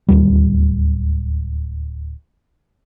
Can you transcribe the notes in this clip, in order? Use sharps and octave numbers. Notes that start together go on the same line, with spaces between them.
D1 G1 D#2 G3